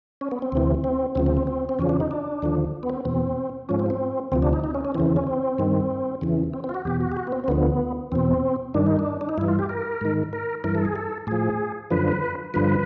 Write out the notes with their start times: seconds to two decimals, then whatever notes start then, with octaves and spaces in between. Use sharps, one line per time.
0.21 C#4
0.31 B3
0.42 C4
0.52 D2 C3 E3
0.84 C4
1.15 D2 C#3 F3 C4
1.26 C4
1.37 C4
1.47 C4
1.69 C4
1.79 E2 C#3 F3 C#4
1.89 D4
2.00 D#4
2.11 D4
2.42 D#2 D3 F3
2.83 B3
2.90 C4
3.05 E2 B2 C4
3.69 G#2 F3 C#4
3.79 C4
3.90 C4
4.32 D2 C3 F3 C4
4.42 D4
4.53 D#4
4.64 D#4
4.75 C#4
4.85 C#4
4.95 E3 C4
4.98 E2 C#3
5.06 C4
5.16 C#4
5.27 C4
5.58 G2 D#3
6.21 E2 C#3 E3
6.53 C4
6.64 C4
6.69 F4
6.74 F#4
6.85 E2 B2 G4
7.01 F#4
7.12 G4
7.17 F#4
7.27 B3
7.32 C4
7.44 C4
7.48 D2 D3 F3 B3
8.12 E2 B2 C4
8.74 G2 D#3 D4
8.86 D#4
8.99 D4
9.21 D4
9.29 D#4
9.38 G2 E4
9.41 E3
9.48 F4
9.59 G4
9.69 A#4
10.01 G#2 D#3
10.33 A#4
10.64 G2 E3 A#4
10.75 A4
10.85 G#4
10.96 A4
11.27 A2 F3 G#4
11.90 F#2 D3 F3 B4
12.54 G2 D3 F3 B4